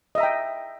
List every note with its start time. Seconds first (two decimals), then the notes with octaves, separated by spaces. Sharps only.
0.15 D#5
0.18 E5
0.20 A#5
0.23 G5